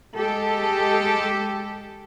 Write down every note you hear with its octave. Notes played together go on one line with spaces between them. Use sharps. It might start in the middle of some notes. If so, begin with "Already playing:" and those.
G#3 G4 A4